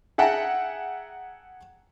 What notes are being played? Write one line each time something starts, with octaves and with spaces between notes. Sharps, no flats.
G#4 E5 F#5 G5 A5 A#5